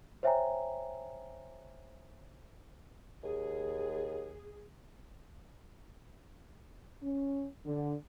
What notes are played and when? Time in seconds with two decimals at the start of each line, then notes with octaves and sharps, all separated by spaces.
0.23 C5 C#5 E5 G5 G#5 A#5
3.23 D#2 G#4
7.03 C#4
7.66 D3